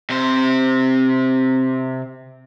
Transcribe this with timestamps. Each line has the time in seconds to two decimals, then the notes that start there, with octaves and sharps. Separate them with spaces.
0.10 C3 C5